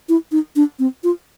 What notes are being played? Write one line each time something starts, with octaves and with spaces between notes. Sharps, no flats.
E4
D#4
D4
C4
F4